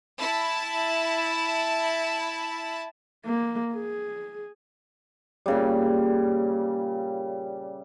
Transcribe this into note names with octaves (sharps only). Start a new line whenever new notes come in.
E4 A5
A#3
G#4
A#2 C#3 G3